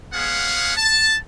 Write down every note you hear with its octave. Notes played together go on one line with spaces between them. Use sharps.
G#3 B3 G#4 C#5 F5 F#5
A5